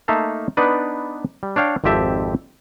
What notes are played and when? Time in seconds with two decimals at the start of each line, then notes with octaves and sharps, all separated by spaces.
0.08 A3 A#3 D#4 E5 F5 A5
0.57 B3 D4 D#4 B4 D5
1.43 G3
1.56 D4 C#5 F5 G5
1.84 G#1 F2 C4 G4 E5 A5